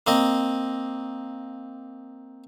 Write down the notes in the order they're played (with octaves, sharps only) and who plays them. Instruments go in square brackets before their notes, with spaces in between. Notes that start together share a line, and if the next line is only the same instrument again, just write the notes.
[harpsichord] A#3 C4 D#5